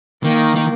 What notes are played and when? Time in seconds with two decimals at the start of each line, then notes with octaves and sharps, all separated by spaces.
0.23 D#3 A#3
0.56 D#3